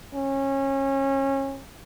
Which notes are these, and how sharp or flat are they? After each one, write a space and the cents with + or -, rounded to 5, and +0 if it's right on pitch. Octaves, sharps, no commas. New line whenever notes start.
C#4 -25